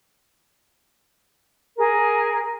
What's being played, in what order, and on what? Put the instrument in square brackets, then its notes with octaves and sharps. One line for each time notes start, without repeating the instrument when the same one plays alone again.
[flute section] G#4 A#4